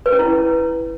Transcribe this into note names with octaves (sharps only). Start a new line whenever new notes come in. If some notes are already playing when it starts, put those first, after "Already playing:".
B4
C#4
E4